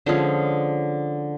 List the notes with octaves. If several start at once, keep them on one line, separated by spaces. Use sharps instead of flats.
D3 F3 G#3 C#4 C5